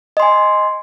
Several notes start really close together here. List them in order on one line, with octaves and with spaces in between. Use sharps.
D#5 C6 G#5